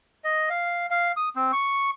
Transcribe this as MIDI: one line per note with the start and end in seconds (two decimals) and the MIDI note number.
0.24 0.49 75
0.50 0.86 77
0.91 1.12 77
1.17 1.29 87
1.36 1.52 60
1.53 1.91 85